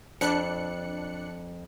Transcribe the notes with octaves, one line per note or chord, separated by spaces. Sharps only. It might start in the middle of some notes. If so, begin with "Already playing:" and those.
F2 D4 F#6 C#7